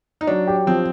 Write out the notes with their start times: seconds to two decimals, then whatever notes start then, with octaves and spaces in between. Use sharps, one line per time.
0.21 D#4
0.27 F#3 D4
0.47 G4
0.67 F3 C4